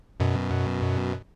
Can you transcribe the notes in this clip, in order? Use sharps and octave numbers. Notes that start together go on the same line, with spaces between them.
F#2 B2